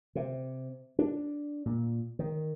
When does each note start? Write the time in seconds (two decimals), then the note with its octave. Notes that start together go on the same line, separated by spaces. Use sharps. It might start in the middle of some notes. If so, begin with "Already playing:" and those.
0.15 C3
0.99 D4
1.66 A#2
2.19 D#3